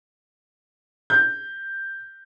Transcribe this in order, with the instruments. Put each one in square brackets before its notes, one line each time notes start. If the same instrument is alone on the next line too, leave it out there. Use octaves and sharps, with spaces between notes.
[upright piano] G6